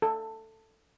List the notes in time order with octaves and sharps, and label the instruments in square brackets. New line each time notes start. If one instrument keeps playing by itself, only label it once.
[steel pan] A4